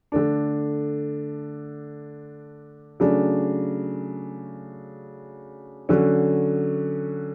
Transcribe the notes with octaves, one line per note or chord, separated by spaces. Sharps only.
D3 A3 D4
C#3 F#3 A3 D4
D3 F#3 C#4